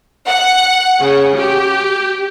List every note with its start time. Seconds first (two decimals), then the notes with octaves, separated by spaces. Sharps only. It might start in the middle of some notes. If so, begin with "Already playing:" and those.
0.27 F#5
1.00 C#3
1.35 G4